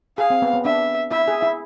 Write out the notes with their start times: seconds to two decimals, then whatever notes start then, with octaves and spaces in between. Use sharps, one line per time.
0.18 G#4 F5
0.30 C4
0.42 B3
0.53 B3
0.65 D4 E5
1.11 E4 E5
1.28 G#4
1.43 E4